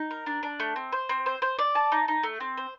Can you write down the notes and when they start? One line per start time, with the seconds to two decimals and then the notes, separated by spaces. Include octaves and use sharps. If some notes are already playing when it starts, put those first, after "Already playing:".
Already playing: D#4
0.11 A#4
0.26 D4
0.43 D4
0.60 A3
0.76 C4
0.92 C5
1.09 C4
1.26 C5
1.42 C5
1.59 D5
1.75 A5
1.92 D#4
2.08 D#4
2.23 A3
2.40 C4
2.57 C5